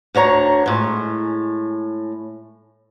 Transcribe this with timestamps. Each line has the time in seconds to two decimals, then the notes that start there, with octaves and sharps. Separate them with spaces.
0.15 D2 D3 C#5 A#5
0.66 A2 G#3